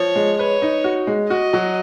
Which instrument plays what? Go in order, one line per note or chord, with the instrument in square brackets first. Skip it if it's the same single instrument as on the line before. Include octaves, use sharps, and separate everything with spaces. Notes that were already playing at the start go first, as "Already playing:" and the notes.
Already playing: [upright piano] F3 [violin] C#5
[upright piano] G#3
[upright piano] B4 [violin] C#5
[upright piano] D#4
F#4
G#3
[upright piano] F#4 [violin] D#5
[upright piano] F#3